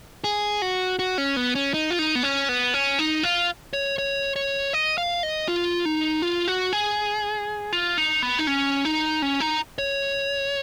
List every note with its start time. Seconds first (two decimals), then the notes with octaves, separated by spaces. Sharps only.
0.24 G#4
0.62 F#4
0.99 F#4
1.18 C#4
1.36 B3
1.55 C#4
1.74 D#4
1.91 F4
1.99 D#4
2.15 B3
2.23 C#4
2.49 B3
2.74 C#4
2.99 D#4
3.23 F4
3.73 C#5
3.98 C#5
4.36 C#5
4.73 D#5
4.98 F5
5.23 D#5
5.48 F4
5.85 D#4
6.22 F4
6.48 F#4
6.73 G#4
7.73 F4
7.98 D#4
8.22 B3
8.39 D#4
8.47 C#4
8.85 D#4
9.22 C#4
9.40 D#4
9.78 C#5